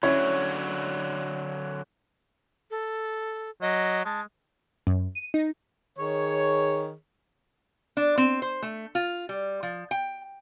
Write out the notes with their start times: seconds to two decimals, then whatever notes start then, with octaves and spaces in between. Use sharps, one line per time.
0.03 D3 F#3 C#4 E4 C#5
2.71 A4
3.62 F#3 D#5
4.05 G#3 A5
4.87 F#2
5.15 D#7
5.34 D#4
5.99 D#3 G#4 C#5
7.97 D4
8.18 C4
8.42 C5
8.62 A3
8.95 F4
9.29 G3
9.63 F3
9.91 G5